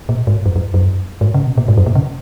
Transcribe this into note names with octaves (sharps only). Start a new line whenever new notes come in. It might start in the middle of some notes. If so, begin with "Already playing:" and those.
A#2
G#2
F#2
F#2
F#2
G#2
C#3
B2
A#2
G#2
F#2
A#2
C#3